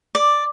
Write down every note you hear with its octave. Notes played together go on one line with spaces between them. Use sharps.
D5